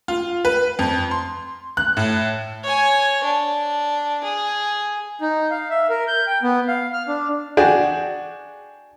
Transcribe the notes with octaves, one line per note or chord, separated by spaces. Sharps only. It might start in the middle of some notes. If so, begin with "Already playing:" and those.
F4
B4
F2
C6
F#6
A2
C#5 G#5
D4
G#4
D#4
F5
E5
A#4
G6
G5
B3
F5
F6
D4
D4 F#4 G#4 G5